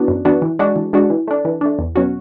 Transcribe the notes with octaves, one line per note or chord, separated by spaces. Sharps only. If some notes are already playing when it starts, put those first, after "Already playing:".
Already playing: E3 B3 D4 F#4
F#2
E3 B3 D4 F#4
E3
G#3 D4 F#4
E3
G#3 D4 F#4
E3
A3 D4
E3
A3 D4
E2
B2 F#3 C#4 F#4